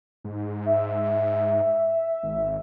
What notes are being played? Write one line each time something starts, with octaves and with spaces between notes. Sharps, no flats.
G#2
E5
G#1